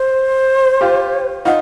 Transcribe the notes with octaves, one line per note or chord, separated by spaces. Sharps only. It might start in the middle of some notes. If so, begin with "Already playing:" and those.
Already playing: C5
F4 G4
D#4 F4 F#5